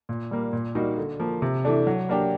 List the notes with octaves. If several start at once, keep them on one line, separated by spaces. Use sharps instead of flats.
A#2
G3 A#3
A#2
G3 A#3 D#4 F#4
D3
F3 A#3
C3
E3 A3 D4
F#3
A#3 D4 G4